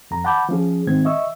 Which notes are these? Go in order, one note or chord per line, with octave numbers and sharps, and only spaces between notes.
F2 A#5
F#5 A5 B5 D6 G6
F3 C#4 G#4
G#2 D#3 C4 G#6
D#5 E5 C#6 E6